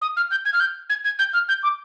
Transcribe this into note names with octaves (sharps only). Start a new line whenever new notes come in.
D#6
F6
G6
G#6
F6
G6
G#6
G#6
G6
F6
G6
D6